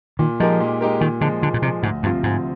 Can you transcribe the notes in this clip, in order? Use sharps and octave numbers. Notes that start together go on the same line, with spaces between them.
A#2 D#3
F3 G#3 D#4 G4 A#4
A#2
G#3 D#4 G4 A#4
A#2 D#3
D3 F3 G#3
A#2 D3
A#2
C3 F3 G#3
D2 G#2
G2 C3 F3 C4 F4
D2 G#2